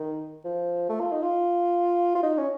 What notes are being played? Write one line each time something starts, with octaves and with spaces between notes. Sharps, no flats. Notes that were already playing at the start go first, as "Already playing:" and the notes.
Already playing: D#3
F3
A3
F4
D#4
F4
F4
D#4
C#4